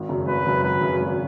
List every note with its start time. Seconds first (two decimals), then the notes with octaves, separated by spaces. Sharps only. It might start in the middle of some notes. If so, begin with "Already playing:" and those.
Already playing: G#1
0.09 F#2 C#3 F#3
0.27 G#1 B4
0.46 F#2 C#3 F#3
0.63 G#1 B4
0.82 F#2 C#3 F#3
1.00 G#1